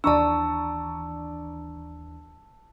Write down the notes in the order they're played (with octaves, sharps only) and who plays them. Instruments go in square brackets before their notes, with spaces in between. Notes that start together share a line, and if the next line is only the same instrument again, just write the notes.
[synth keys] D#2 E3 D4 [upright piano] D5 A#5 C#6 [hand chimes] A5 E6